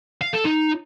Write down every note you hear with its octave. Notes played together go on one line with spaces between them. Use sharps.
F5
A4
D#4